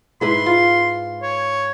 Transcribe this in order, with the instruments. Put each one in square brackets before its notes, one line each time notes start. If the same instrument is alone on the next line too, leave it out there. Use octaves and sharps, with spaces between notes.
[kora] G#2 E4 B4 [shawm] C6
[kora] F4
[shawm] C#5